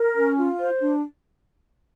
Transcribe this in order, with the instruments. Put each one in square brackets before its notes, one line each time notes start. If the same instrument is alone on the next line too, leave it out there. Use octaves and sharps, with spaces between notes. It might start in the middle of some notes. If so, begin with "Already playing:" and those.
Already playing: [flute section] A#4
C#4
F4
C5
D4